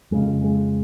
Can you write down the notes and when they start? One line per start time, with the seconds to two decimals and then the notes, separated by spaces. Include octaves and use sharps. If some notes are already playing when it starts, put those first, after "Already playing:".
0.11 F2 C#3 G#3
0.44 G#3